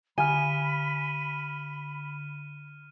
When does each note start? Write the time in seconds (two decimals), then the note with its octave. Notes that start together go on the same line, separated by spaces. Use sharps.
0.18 D3 G#5 B5 F6 D#7